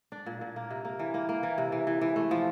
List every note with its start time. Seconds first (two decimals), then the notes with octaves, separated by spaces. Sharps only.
0.12 D4
0.26 A#2
0.41 A#2
0.56 A#3
0.70 C3
0.85 A#3
0.99 E3
1.14 A#3
1.29 A#3
1.43 E3
1.58 C3
1.72 E3
1.87 E3
2.01 E3
2.16 A3
2.31 F3